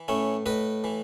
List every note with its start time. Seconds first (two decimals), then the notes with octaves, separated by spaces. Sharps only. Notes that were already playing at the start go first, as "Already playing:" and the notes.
Already playing: E3
0.08 A2 C#4 E4
0.46 A2 B4 D#5
0.84 E3